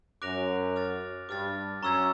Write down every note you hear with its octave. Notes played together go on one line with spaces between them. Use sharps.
F#2 D6 F#6 A#6 D7 F7
D6 F6 A6
G2 D6 F6 A6
F#2 A#5 C#6 E6 G#6